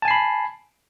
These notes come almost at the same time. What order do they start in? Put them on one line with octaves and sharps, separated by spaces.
A5 G#5 C7 B5